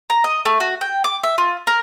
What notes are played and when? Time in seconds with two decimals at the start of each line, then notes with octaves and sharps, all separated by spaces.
0.10 A#5
0.24 D#5
0.45 A3
0.60 F#4
0.81 G5
1.04 D6
1.23 E5
1.38 F4
1.67 A#4